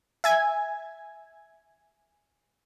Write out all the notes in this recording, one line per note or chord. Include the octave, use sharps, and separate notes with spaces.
E5 G#5 G#6